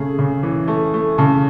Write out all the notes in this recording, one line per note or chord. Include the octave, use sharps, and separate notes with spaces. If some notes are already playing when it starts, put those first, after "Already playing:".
Already playing: C#3 A3 G#4
C#3
E3
A3
A3
C#3 A4